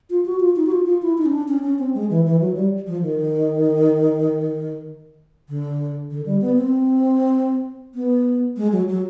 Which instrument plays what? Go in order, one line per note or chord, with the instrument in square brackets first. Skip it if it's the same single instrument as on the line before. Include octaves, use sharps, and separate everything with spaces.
[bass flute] F4
F#4
F4
D#4
F#4
F4
F4
E4
D#4
C#4
D4
C#4
C#4
C4
G#3
E3
E3
F#3
G3
F3
D#3
D3
D3
G3
B3
C4
B3
G#3
F#3
F#3